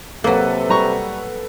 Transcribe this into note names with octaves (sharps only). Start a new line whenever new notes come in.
C3 F#3 A#3 A4 B4 F#5
G3 A#5 C#6